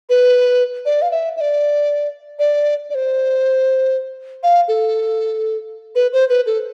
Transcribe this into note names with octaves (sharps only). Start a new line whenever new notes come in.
B4
D5
F5
E5
E5
D5
D5
D5
C5
F5
A4
B4
C5
B4
A4